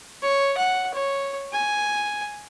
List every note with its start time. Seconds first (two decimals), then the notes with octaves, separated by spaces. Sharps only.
0.22 C#5
0.58 F#5
0.94 C#5
1.53 G#5